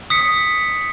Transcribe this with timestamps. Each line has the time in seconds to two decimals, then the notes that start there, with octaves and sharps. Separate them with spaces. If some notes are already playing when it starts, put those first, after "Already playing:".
0.10 D#6 B6 C#7